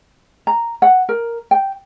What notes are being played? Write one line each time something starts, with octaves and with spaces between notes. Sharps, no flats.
A#5
F#5
A#4
G5